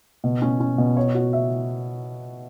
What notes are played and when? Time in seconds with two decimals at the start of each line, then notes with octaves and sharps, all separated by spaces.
0.24 B2
0.42 C#4
0.60 C#4
0.78 B2
0.97 C#5
1.15 F#4
1.33 E5